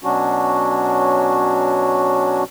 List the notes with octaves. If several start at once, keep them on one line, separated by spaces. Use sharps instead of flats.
B2 F#3 C#4 D4 F#4